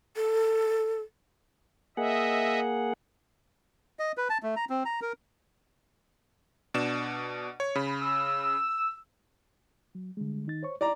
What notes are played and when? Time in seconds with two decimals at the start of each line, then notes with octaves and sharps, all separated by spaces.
0.16 A4
1.97 A#3 G#4 D#5 E5 F#5
3.99 D#5
4.17 B4
4.30 A5
4.43 A3
4.56 A#5
4.70 C4
4.85 A#5
5.02 A#4
6.74 B2 D4 E7
7.60 C#5
7.75 C#3 B5
8.03 E6
9.95 F#3
10.17 D3 G3 G#3
10.46 D#3 D#4 A6
10.63 C5 C#5 C#6
10.81 E4 D5 A#5